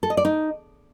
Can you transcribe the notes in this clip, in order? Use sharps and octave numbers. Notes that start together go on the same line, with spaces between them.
A4
D#5
D5
D#4